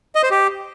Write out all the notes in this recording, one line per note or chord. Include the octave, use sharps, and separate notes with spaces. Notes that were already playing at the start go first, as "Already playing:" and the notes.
D#5
C5
G4